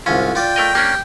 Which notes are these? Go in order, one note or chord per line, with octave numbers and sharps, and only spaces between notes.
C2 G#2 C#4 F4
F4 D5 G5
A3 A#4 D#5
A#3 C#4 D4 G4